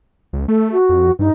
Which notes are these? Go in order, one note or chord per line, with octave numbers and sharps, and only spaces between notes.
C#2
A3 A4
F#4
F2
G2 D#4